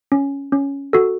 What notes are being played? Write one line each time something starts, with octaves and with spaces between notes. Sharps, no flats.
C#4
C#4
F#4 A4